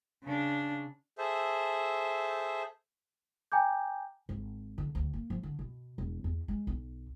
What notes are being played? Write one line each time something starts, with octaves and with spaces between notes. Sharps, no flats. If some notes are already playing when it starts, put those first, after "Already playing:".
C#3 D4
G#4 A4 C5 E5
G5 G#5 A#5 D6 G6
G#1
D3
D2
A#3
F3
D3
B2
E1
E2
G#3
B1